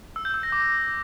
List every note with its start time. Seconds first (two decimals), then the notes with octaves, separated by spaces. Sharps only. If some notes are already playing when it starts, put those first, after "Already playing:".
0.16 E6
0.25 G6
0.34 E6
0.43 A#6
0.52 D6